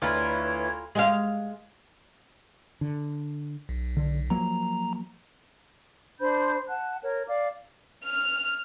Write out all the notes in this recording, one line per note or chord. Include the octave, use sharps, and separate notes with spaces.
D2 E4 F4 A#4 B4 C#5 B5 G#6
G#3 E5 F5
D3
B1
D3
F3 F#3 A#3 A#5
D4 C5 B5 G6
F#5 A5 F#6
A#4 C#5
D5 F5 D6
F6